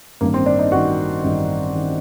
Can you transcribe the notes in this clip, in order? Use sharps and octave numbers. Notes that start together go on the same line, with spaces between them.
A1 G2 D#3 A#3
C4
D4
D#4
A1 G2 D#3 F#4
A1 G2 D#3
D#3